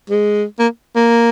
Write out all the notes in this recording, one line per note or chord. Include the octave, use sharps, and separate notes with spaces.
G#3
A#3
A#3